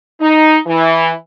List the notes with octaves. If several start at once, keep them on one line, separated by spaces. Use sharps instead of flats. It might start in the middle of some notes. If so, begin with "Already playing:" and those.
D#4
E3